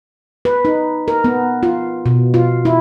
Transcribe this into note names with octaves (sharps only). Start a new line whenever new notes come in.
B4
D#4
A#4
B3
F4
B2
F4
E4